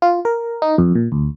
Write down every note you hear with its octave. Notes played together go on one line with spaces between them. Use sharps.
F4
A#4
D#4
F2
A#2
D2